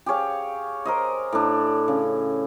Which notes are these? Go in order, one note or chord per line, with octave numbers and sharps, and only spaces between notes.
G4 G#4 C#5 F5
A#4 C5 D#5
A2 D4
C#3